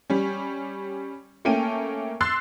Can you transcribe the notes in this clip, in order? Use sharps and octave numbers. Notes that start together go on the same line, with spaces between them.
G3 C#4
A3 A#3 C#4 G5 D#7
C6 E6 F#6 A6 C7